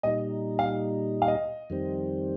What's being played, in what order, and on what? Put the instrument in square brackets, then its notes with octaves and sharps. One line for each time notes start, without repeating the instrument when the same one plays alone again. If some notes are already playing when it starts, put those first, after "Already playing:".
[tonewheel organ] A#2 G3 D#4 [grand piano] D#5
[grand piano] F5
F5
D#5
[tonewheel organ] F2 D#3 G3 C4